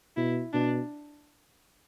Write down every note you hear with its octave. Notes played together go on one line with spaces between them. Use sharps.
B2 E4
B2 D4